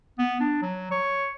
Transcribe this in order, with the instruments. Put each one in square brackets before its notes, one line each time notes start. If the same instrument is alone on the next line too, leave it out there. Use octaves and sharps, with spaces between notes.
[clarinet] B3
D4
F#3
C#5